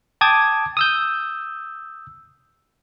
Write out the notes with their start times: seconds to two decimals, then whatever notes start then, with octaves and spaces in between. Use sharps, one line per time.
0.21 G5 A5 D6 D#6 G#6
0.77 D#6 E6 G6